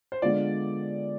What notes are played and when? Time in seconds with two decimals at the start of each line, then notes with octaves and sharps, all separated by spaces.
0.12 C5
0.22 D3 G#3 B3 F4 D5